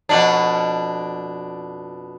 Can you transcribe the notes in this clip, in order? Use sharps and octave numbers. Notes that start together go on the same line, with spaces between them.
F2 B2 D4